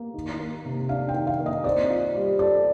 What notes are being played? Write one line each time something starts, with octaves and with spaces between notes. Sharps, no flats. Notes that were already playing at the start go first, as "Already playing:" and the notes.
Already playing: A#3
D#3
A#3
C3
D4 F5
G5
D#3
F5
A#3
D#5
C4 D5
F4
G3
A4 D5